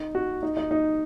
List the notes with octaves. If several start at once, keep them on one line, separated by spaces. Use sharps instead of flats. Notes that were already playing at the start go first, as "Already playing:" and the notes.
Already playing: D#4
F#4
D#4
D#4
D#4